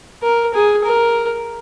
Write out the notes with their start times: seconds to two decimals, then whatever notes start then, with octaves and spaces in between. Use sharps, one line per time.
0.23 A#4
0.54 G#4
0.84 A#4